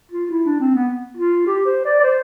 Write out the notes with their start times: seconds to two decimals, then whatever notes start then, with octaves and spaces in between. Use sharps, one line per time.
0.12 F4
0.31 E4
0.46 D4
0.60 C4
0.74 B3
1.17 F4
1.47 G4
1.66 C5
1.85 D5
1.99 D5
2.04 C5